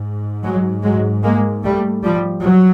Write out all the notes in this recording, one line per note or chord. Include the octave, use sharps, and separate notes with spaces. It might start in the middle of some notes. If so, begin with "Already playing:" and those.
Already playing: G#2
F#3 G#3
F#3 G#3
G#3 A#3
G3 A3
F3 G3
F#3